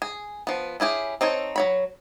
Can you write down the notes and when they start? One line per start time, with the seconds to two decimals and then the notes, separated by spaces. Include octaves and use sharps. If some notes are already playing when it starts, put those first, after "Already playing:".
0.02 G#4
0.47 F3 B3
0.80 C#4 E4 G4 G#4
1.21 C4 D#4 A4 C#5
1.56 F#3 C#5 B5